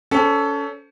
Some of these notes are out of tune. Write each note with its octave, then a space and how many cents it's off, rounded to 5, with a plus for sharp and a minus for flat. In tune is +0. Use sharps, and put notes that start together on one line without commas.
C#4 +25 A4 +0 C5 +0